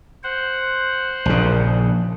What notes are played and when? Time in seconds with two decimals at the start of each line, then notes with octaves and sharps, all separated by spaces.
0.24 C5 F#5
1.25 A#1 C#3